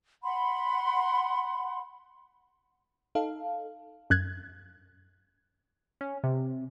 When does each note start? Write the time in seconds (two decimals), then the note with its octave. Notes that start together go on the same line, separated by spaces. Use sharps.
0.24 F#5 B5 C6
3.15 D#4 A4 F5
4.10 F#2 F#6 G#6
6.01 C#4
6.24 C3